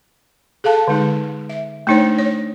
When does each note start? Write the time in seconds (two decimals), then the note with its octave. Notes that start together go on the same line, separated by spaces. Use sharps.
0.64 G#4 A4 F5 A5
0.87 D3 G#3 D#4 G#4
1.49 E5
1.87 A3 D4 D#4 C5 C#5
2.18 C#5